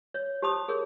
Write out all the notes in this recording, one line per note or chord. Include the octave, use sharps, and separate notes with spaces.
C#5
G4 C5 A5 B5 D#6
G#4 A#4 C#5